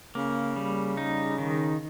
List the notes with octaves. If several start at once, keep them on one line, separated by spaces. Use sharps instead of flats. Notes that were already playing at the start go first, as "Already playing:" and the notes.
C#3 A#3
G3
D#4
D#3